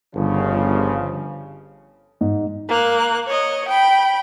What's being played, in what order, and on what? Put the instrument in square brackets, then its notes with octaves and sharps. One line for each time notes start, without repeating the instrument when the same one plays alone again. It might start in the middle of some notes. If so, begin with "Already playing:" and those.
[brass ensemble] G1 C#3 F3
[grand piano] G#2
[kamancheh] A#3 F#6
C#5 D#5
G5 B5